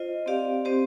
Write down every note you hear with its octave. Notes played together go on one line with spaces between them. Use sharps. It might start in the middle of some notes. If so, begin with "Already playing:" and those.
Already playing: F4 C5 D#5
C4 G4 D5 F5
C4 G4 C5